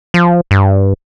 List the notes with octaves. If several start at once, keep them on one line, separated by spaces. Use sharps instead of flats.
F3
G2